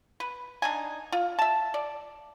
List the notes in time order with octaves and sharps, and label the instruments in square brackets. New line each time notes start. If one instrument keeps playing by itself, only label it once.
[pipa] B4
D4 D#4 G#5
F4
E5 A5
D5